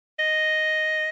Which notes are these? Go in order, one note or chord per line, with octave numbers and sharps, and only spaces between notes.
D#5